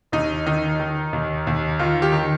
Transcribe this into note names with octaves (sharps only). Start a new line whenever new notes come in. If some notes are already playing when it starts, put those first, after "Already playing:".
D#2 D#4
D#3 D#4
D#3
D#2
D#2
D#3 F4
G4
D#3